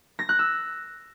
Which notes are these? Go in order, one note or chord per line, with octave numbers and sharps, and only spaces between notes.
A#6
F#6
E6